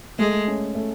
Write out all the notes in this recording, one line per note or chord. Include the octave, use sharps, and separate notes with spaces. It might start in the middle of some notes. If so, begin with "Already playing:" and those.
G#3 A3
C#4
A3